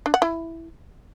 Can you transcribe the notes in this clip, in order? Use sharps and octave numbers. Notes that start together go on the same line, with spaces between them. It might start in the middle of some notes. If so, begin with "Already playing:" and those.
D4
F#5
E4